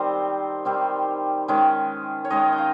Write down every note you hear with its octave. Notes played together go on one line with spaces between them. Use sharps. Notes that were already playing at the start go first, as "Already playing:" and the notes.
Already playing: D#3 G3 C4 C5
D#3 G3 C4
D#3 G#3 C#4
C#5
D#3 G#3 C#4 D#5
G5
F5